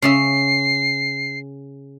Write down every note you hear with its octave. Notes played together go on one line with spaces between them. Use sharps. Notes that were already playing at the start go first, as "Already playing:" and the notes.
C#3 C#4 E5 C7